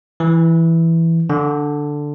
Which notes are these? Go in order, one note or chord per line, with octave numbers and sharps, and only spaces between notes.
E3
D3